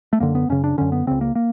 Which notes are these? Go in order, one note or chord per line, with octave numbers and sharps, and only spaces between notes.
A3
F#2 D3 A#3
B3
F#2 C#3 C#4
D4
F#2 D3 C#4
B3
C#2 C#3 C4
A#3
A#3